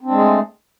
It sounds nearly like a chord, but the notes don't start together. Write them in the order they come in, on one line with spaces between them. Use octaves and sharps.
C4 D4 G#3 G#4 A3